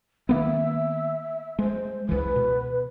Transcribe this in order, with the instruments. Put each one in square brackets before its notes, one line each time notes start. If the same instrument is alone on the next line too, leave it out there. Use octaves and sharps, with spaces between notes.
[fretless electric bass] D#3 A#3 B3 [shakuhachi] E5
[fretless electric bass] G#3 [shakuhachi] C5
[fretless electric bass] C#2 E3 [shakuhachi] B4
[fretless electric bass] B2